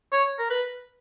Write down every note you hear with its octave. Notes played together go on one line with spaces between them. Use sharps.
C#5
A#4
B4